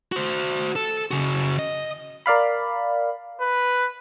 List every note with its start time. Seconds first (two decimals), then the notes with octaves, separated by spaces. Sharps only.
0.12 F#4 C5
0.76 A4
1.11 C#3 F#4
1.59 D#5
2.26 A#4 D5 F5 B5
3.40 B4